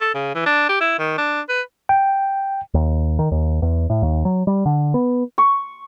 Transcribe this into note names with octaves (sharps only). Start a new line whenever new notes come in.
A4
C#3
E3
D4
G4
E4
D#3
D4
B4
G5
D#2
D#3
D#2
E2
A2
D#2
F#3
G3
D3
B3
C#6